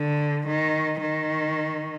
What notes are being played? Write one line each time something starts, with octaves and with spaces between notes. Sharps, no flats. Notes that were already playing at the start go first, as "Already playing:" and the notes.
Already playing: D3
D#3
D#3